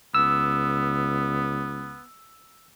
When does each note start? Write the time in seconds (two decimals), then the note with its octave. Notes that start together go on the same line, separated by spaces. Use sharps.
0.15 C#2 B3 E6